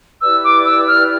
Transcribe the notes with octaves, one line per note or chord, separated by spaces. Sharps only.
E4 G4 B4 D5 E6
D6
E6
F6